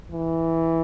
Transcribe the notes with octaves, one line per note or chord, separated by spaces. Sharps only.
E3